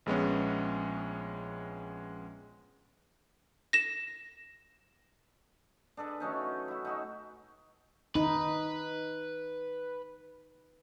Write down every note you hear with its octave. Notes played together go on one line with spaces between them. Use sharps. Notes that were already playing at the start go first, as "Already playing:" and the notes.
A#1 G#3 B3 C#4
A#6 E7
D4 G#4 A4 B4
F#3 A3 C#4 D#4
E4 F#4
D#4 F#4 E5
D#4 B4